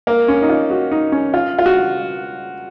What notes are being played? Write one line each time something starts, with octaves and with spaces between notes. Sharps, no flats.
A#3
C#4
D#4
F4
F#4
D#4
C#4
F4
F4
F#4